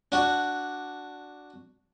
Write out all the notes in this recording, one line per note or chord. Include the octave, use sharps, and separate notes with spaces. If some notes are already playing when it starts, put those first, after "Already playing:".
D4 F#4